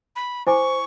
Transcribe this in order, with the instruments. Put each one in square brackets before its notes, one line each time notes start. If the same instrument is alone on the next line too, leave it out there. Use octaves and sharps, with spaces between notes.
[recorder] B5
[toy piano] E4 G#5 D6 [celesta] C5 [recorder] C#6